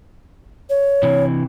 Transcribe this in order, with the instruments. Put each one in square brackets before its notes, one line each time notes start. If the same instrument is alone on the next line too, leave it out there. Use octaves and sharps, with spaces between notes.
[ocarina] C#5
[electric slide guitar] C3 E3